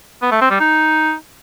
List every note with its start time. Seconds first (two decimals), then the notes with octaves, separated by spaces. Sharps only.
0.22 B3
0.31 A3
0.41 C4
0.51 G3
0.60 D#4